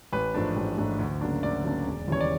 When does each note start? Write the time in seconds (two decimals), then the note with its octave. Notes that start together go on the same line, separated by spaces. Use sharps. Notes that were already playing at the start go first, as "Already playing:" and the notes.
0.13 A1 B4
0.34 G#2 F3 A3 D4
0.57 A1
0.78 G#2 F3 A3 D4
0.99 D2
1.21 C#3 F#3 A#3 D4
1.43 D2 D5
1.64 C#3 F#3 A#3 D4
1.86 E1
2.08 D#2 C#3 E3 G3 C#5
2.21 D5